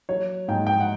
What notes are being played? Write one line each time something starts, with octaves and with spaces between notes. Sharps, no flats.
F#3 C#5
G#2 G5
G5
F#5